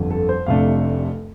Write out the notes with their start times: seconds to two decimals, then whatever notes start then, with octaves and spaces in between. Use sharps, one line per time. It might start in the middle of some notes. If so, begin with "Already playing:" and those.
Already playing: G1 F2 D3
0.10 A4
0.29 C5
0.46 F1 F2 C3 A3 D4 F5